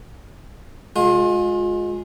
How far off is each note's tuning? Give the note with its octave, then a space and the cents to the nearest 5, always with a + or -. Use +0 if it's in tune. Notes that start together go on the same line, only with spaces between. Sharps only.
G#3 +0 F4 +35